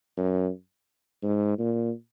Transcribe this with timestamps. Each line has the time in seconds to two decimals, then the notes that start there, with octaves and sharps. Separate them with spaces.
0.17 F#2
1.23 G#2
1.59 A#2